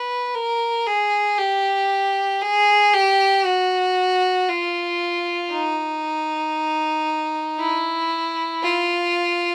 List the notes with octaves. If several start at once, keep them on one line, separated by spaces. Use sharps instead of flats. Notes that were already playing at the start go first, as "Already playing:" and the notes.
Already playing: B4
A#4
G#4
G4
G#4
G4
F#4
F4
D#4
E4
F4